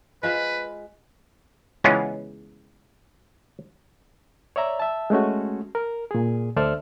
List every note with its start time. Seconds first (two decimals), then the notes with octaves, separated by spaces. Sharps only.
0.23 G#3 F4 B4 C5
1.84 C#3 E3 G#3 B3 C#4 F4
4.56 C#5 D5 E5 A#5
4.80 E5 A5
5.10 G#3 A3 C#4 F#4
5.75 A#4
6.11 A#2 G#4
6.56 D2 A4 C5 D5 E5 F6